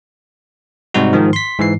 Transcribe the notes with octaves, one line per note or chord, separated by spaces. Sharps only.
G#2 C3 G3 D#4 F#4
G#2 D#3 F3
C6 B6
G#2 E3 C7